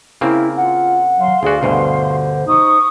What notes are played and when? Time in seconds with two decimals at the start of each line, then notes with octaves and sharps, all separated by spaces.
0.21 C#3 A#3 C4 E4
0.56 F4 F#5
1.18 F#3 F5 C6
1.43 D2 F#4 G#4 D5
1.63 D2 G2 B2 D3 C5
2.47 D#4 C#6 D#6